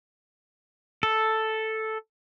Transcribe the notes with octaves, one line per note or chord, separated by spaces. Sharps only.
A4